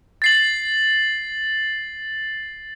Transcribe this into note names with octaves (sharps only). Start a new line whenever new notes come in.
A6 C7 F#7